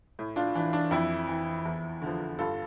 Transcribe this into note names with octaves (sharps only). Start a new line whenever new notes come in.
A2
D4 F4
E3 D4
D4
F2 E4
E3
E2
D3 F3
G2 F4 A4